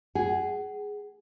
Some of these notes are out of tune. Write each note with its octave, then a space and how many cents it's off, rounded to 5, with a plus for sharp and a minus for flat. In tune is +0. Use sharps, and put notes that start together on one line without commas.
G#4 +0 F#5 +25